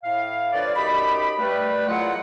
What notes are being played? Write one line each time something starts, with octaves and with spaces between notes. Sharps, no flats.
A2 F5
D3 F3 B4 C#5 D5
F#2 D#4 G4 B5
G3 A3 B4
E2 A#2 F#3 F4 D#5 F#5